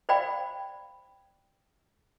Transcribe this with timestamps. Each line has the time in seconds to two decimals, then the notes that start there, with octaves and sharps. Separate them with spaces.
0.09 C5 D5 F5 G5 B5